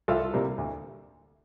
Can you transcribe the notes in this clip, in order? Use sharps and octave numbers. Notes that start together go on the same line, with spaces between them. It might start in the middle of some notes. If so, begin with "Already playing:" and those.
C2 F4 A4
C3 G3 A#3
D2